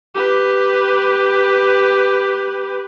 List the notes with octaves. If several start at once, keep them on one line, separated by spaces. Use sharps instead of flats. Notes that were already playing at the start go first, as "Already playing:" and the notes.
G4 B4